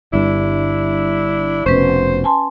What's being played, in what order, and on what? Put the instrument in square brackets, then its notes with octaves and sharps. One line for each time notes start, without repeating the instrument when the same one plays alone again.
[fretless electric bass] G1 G2 [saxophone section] D4 E4
[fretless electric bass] F1 B2 [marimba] C#4 B4 [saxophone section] C5
[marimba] G#5 A5 C6